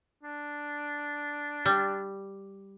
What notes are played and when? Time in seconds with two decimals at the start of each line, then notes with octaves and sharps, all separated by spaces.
0.23 D4
1.66 G3